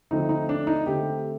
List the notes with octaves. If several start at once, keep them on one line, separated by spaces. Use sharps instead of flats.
D3 F3 A3 C4 D#4
D#4
D4
D#4
D3 A3 C4 G4